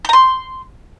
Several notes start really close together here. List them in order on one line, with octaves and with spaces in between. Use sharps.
G6 A#5 C6